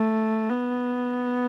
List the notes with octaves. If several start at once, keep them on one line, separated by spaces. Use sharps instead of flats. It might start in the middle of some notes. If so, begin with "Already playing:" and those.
Already playing: A3
B3